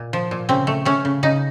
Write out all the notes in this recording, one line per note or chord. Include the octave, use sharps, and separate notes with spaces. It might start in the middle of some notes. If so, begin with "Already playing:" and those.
Already playing: A#2
F3
A#2
C#3 C4
A3
A3 C#4
C#3
C#3 D#4